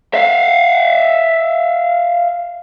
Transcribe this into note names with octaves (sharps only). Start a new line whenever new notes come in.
E5 F5